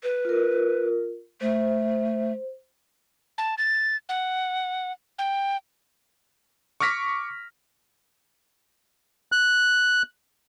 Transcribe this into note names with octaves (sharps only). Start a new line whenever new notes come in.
B4
F4 A#4
A3 C5
A5
A6
F#5
G5
C#6 D6 F6 A#6 B6
F#6